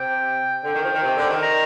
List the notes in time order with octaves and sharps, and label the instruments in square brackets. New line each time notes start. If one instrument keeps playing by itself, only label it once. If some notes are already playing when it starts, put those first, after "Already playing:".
Already playing: [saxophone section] C3 [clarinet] G5
[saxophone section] D3 [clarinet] G5
[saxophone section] D#3
F3
D#3
C3
D3
D#3
[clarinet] A#5